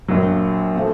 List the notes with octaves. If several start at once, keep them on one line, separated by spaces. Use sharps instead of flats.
A#1 A#2 F#3
A#2 F3 A3